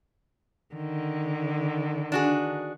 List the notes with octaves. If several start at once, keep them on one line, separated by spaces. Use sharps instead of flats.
D3 D#3
D4 F#4 G#4